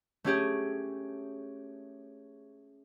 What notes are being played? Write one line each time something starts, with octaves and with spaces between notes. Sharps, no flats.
A3 C#4 G4 G#4